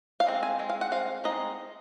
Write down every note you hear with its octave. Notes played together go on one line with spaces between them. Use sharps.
F5
G#3 C4
G#5
G#3 C4
F5
F#5
G#3 C4 F5
G#3 C4 D#4 D#5